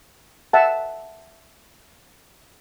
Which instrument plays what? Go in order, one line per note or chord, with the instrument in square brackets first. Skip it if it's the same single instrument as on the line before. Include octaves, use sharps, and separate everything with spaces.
[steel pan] E5 F#5 A5